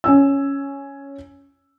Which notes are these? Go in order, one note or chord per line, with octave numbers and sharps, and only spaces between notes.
C#4 G#5 E6